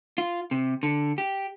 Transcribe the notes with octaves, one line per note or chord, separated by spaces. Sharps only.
F4
C3
D3
G4